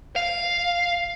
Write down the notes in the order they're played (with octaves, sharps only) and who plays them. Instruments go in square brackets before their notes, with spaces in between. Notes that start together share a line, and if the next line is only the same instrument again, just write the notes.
[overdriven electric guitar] F5